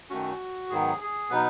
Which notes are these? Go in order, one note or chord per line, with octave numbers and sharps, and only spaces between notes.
F#2 D#3 A3 C#4 F#4
G#2 D#3 F#3 B3 G#4
G#4
B2 F#3 B3 D#4 B4